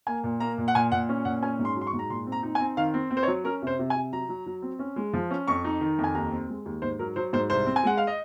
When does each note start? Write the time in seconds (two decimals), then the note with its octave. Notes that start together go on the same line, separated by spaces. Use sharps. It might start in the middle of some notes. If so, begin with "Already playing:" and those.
0.07 A#3 G#5
0.24 A#2
0.40 A#3 A#5
0.58 A#2
0.68 F#5
0.75 A#2 G#5
0.92 A#2 F#5
1.09 C#4
1.25 A#2 F#5
1.42 C#4 G#5
1.59 G#2
1.65 C6
1.76 F#3
1.81 C6
1.87 C#6
1.93 G#2
1.99 A#5
2.10 A#2 C6
2.27 C4
2.32 A#5
2.43 D#4
2.55 G#5
2.60 C4
2.77 D#3 F5
2.94 C4
3.11 C4
3.17 C5
3.23 C#5
3.28 F#3
3.44 C#4 A#4
3.62 C3 C5
3.79 C3
3.90 G#5
3.95 C3
4.12 F#3 A#5
4.29 F#3
4.46 F#3
4.62 C4
4.79 C#4
4.96 G#3
5.13 F3
5.31 C#4
5.47 F2 C#6
5.64 D#4
5.81 D#3
5.98 F2
6.04 G#5
6.15 D#2 A#5
6.31 C4
6.48 G#3
6.66 D#2
6.82 G#2 C5
6.99 F#3 A#4
7.16 F#3 C5
7.33 G#2 C5
7.50 C2 C5
7.66 C4
7.76 G#5
7.83 G#3 F#5
7.97 F5
8.07 D#5